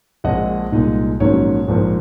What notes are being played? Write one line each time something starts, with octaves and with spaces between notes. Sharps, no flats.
A#1 A#2 G#3 C4 D#5 F#5
C2 A#2 G#3 D#4
A#1 G#2 D#3 F#3 C#4 C#5
A#1 G#2 F3 A#3